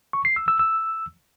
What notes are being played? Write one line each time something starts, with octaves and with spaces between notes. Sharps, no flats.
C#6
C7
E6
E6
E6